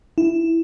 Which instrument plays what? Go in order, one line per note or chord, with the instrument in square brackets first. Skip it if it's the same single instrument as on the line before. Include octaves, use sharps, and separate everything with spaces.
[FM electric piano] E4